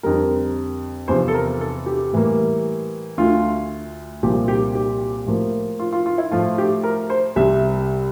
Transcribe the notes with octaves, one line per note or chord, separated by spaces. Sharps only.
F2 D3 G3 A#4
E2 C3 F3 C5
A4
A#4
A4
G4
A2 E3 G3 A#3
D2 D3 A3 F4
C2 A#2 F3 G4
G4
G4
A2 F3 A#3
F4
F4
F4
E4
A2 F3 A3 F4
G4
A#4
C5
C2 C3 G3 E5